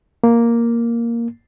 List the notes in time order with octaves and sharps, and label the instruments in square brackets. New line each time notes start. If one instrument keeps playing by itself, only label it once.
[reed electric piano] A#3